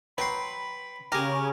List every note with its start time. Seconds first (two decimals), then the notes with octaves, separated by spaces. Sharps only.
0.18 F#3 B4 G5 B5 C6
1.12 C#3 C#4 G4 G#4 A#4